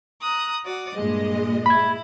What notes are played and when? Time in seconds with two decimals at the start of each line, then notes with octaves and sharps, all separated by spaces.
0.21 A#5 D#6 F#6
0.64 F#4 D5 D#6
0.94 G2 A#2 G#3 D#5
1.66 E4 B5 G#6